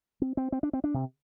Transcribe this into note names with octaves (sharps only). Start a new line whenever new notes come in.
C4
C4
C4
D4
C4
D4
C3